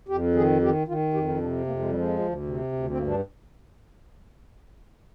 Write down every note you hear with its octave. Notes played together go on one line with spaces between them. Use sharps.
F2 G4
D#3 G#4
D#3 G4
D#3 F4
F2 G4
D#4
C3 D4
F2 A#3
G#3
G3
F3 G#3
D2
C3
D2
C4
G2 A#3
D4